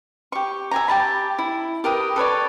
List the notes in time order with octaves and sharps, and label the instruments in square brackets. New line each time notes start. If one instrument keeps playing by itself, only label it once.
[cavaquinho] G4 C#6
E5 G#5 A#5
G4 A5 B5
E4
G4 A#4 B4 D#6
A4 B4 C#5 D5